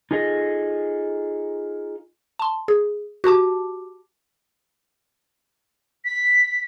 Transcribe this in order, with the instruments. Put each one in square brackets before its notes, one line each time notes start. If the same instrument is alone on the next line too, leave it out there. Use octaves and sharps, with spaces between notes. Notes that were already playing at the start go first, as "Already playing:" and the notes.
[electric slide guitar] D#4 F4 G#4 A4 D#5
[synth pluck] A5 C6
G#4
F#4 G4 A5 D6
[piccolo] B6